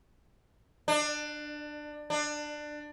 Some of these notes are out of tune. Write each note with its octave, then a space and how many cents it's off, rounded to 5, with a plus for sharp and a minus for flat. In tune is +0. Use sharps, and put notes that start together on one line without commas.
D4 +20
D4 +20